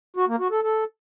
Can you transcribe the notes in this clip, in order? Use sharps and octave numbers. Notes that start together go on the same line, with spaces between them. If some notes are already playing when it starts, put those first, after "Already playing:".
F#4
A#3
F#4
A4
A4